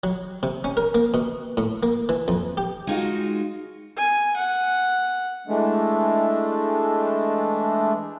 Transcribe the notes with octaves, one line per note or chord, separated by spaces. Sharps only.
F#3
C3
C#4
A#4
A#3
B2
A2
A#3
E3
F2
G4
G#3 D#4 F4 F#4
G#5
F#5
E3 G#3 A3 D4